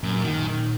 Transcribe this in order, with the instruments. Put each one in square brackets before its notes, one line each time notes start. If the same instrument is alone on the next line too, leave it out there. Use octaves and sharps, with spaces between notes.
[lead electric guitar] F#2 [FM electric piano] A#2
[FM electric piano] A#2 [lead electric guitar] D#3